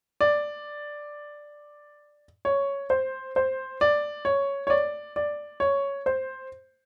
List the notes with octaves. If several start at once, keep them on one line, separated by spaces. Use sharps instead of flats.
D5
C#5
C5
C5
D5
C#5
C#5
D5
D5
C#5
C5